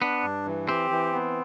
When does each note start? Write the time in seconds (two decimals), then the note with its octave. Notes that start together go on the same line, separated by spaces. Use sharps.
0.01 B3 D4
0.23 G2
0.46 E3
0.68 C4 G4
0.90 E3
1.13 B3